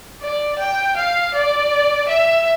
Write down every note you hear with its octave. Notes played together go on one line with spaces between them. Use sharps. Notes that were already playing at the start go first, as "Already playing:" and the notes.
D5
G5
F5
D5
E5